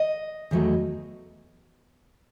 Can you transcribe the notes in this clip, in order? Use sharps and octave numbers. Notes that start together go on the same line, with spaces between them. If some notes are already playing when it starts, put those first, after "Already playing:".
Already playing: D#5
E2 D#3 F#3 A3